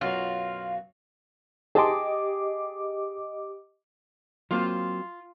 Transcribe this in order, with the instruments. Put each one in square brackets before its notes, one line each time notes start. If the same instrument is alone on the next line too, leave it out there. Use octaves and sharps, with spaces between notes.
[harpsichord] B1 F#2 F#3 [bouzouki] F4
[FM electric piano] G4 D#5 D6 [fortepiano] G#4 A5 C6
[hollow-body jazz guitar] F#3 A#3 C4 [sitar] F4